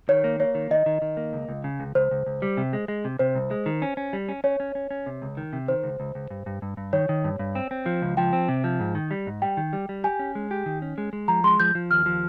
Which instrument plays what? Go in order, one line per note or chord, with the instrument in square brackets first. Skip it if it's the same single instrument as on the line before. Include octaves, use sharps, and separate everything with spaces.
[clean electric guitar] D#3 [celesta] C#5
[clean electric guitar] A#3
[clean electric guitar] A#3 [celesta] C#5
[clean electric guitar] D#3
[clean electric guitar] D#3 [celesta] D#5
[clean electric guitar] D#3
D#3
A#3
C#2
C#2
C#3
C#2
[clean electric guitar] C#2 [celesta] C5
[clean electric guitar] C#2
C#2
G3
C3
G#3
G#3
C3
[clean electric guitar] C3 [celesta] C5
[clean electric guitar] C2
G#3
D#3
C#4
C#4
G3
C#4
[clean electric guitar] C#4 [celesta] C#5
[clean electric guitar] C#4
C#4
C#4
C3
C#2
D#3
C3
[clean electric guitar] D#3 [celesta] C5
[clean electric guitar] C#2
C#2
C#2
G2
G2
G2
G2
[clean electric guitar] D#3 [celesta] C#5
[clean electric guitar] D#3
G2
G2
C4
C4
F3
C#2
[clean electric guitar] F3 [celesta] G5
[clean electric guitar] C4
C3
F3
G#2
D#3
G3
G#2
[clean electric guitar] G3 [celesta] G5
[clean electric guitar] D#3
G3
G3
[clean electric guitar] G4 [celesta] G#5
[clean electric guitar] C#4
G#3
G4
D#3
C#4
G#3
G#3
[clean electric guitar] F3 [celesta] A#5
[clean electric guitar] G#3 [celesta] C6
[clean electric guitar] F3 [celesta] G6
[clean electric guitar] F3
[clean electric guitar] D#2 [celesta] F6
[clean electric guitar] F3